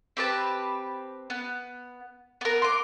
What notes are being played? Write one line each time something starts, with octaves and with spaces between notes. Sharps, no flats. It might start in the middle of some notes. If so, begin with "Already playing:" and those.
C4 G4 B4 A5
B3
B3 A#4
C6 D6